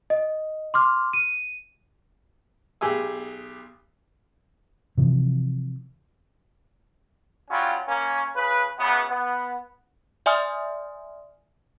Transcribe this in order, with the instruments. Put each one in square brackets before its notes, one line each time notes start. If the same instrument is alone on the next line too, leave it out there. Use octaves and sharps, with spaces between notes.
[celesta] D#5
C6 D6 F6
D#7
[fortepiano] B1 G4 G#4 G#5 E6
[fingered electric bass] C3 E3 F3
[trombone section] F#3 G3 C#4 F4
A#3 C#4
C#3 B4
F#2 C#3 B3
B3
[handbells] D5 E5 G#5 C6 D#6 F6